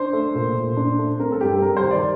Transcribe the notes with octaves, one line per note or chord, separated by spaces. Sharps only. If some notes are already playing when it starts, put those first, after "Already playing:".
Already playing: D4 C5
A3
A#2
A#2
D4
A3
C4 A#4
A4
G2 G4
G3 A#4
C5
D#3
D5